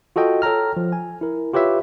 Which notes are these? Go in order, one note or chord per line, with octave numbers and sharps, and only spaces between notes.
F4 F#4 A4 D#5 G5
A4 C#5 G5 A#5 F6
F3
G#5
E4 A#4
F4 G4 B4 C#5 E5